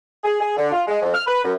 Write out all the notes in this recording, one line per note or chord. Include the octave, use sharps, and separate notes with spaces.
G#4
G#4
D3
F4
G#3
F2
F6
B4
F#2